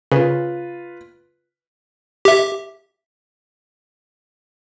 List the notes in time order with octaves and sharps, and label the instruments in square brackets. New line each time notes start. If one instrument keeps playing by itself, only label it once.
[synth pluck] C#3 [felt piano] F4 B4
[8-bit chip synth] G4 E5